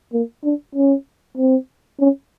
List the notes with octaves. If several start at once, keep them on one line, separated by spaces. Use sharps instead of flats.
A#3
D4
C#4
C4
C#4